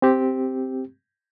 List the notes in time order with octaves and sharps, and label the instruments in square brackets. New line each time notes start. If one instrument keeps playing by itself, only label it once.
[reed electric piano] C4 G4